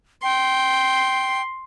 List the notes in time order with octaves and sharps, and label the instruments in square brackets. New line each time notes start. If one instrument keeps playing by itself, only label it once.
[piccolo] G5 [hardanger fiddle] C6